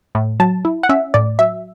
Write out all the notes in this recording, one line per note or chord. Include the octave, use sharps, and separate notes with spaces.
A2
F#3 A5
E4
F#5
C#4 E5
A2 D5
F#3 E5